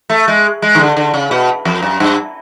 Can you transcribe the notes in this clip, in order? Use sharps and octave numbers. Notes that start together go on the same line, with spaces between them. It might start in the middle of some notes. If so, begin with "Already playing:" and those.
A3
G#3
G#3
D#3
D3
D3
C#3
B2
F2
F#2
G2